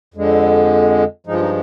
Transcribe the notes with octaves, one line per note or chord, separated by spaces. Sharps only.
F2 D3 G#3
G2 F3 G#3 D#4
F4
D#4